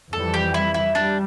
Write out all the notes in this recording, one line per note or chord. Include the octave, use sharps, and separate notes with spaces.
F2 E3 G3 A4
G4
E4
E4
G3 D4